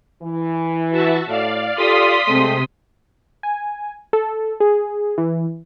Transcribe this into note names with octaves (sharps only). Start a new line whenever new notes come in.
E3
F#4 E5 A5
A2 D5 F5
F4 G4 A4 C6 D#6 B6
C3 G#3 A3 C4
G#5
A4
G#4
E3